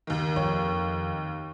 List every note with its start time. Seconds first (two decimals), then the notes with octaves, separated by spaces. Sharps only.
0.07 D#2 D#3
0.36 F2 C#5 G5